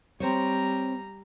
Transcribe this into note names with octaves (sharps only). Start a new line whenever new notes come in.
G3 C4 C5 C#5 A#5